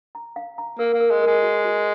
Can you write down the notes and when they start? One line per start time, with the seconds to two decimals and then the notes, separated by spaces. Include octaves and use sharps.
0.15 A#5
0.36 F5
0.58 A#5
0.79 A#3 A#4
0.94 A#3
1.00 A#4
1.11 G#3
1.22 G#3 A#4
1.43 F#4
1.65 F#4